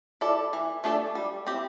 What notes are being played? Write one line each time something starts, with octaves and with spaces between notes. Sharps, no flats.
E4 A4 D5
E3
A3 D4 A4 D5
G3
C4 E4 G4